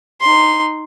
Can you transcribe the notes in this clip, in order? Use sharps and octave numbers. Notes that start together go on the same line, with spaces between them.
D#4 C6